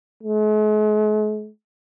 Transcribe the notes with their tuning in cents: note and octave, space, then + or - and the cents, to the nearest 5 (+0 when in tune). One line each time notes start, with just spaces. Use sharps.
G#3 +45